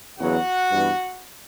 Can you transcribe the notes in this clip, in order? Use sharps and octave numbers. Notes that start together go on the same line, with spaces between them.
E2 C#3 F#3 B3 F#4 F#5
G2 E3 B3